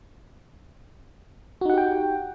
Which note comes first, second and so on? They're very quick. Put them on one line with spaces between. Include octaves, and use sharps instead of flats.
F#4 D#4 F#5 G4 G5